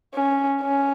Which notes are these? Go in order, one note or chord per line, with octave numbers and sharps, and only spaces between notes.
C#4
C#4